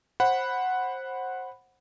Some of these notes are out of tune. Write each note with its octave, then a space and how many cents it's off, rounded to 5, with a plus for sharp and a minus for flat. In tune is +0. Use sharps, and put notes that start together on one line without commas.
C5 +20 F#5 +0 B5 +0